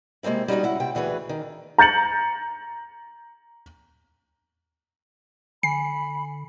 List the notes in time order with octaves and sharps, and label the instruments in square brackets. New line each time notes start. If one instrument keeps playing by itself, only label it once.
[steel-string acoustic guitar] C3 G#3 A#3 C4 E4
G3 D#4 F4 F#4 D#5
C#3 E4 F#5
C3 G5
D2 E3 F#4 G#4 B4
D#3
[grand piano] A#5 G6 A6 C#7 F#7
[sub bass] D3 [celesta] G#5 [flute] B5 [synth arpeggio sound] C7